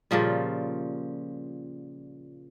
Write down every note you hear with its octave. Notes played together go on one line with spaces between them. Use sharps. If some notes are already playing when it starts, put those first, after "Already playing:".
A#2 C#3 F3 G3